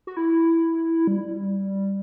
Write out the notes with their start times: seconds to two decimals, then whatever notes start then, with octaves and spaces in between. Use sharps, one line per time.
0.07 F#4
0.17 E4
1.07 G3